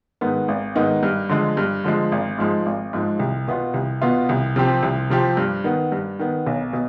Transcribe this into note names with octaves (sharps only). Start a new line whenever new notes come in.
G#2 D#3 B3 D#4
G#1
G#2 D#3 B3 D#4
G2
D3 F3 G#3
G2
D3 F3 G#3
G#1
G#2 F3 G#3
G#1
G#2 F3 G#3
C2
B2 B3 F4
C2
B2 B3 F4
C2
C3 F3 C4 G4
C2
C3 F3 C4 G4
G2
D#3 B3
G2
D#3 B3
B1
B2